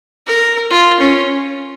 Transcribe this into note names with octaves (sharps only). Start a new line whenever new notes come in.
A#4
F4
C#4